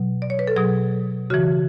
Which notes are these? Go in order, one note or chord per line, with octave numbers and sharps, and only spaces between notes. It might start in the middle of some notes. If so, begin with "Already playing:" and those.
Already playing: B2 F#3
D5
C#5
B4
A4
B2 F#3 G#4
C#3 E3 F#4